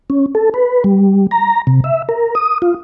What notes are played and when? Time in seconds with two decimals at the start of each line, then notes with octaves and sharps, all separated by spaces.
0.10 C#4
0.35 A4
0.54 B4
0.84 G3
1.31 A#5
1.67 C3
1.84 E5
2.09 A#4
2.35 D#6
2.62 F4